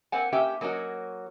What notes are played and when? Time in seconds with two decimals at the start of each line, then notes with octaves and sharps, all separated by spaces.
0.12 A#3 C4 F#5 G#5
0.32 A#3 C#4 G4 E5 G5
0.61 F#3 A#3 C#4 F#4 D#5